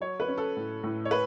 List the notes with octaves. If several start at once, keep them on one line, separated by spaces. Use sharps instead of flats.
F#3 C#5
B4
C#4
A4
A2
A2
C#5
B4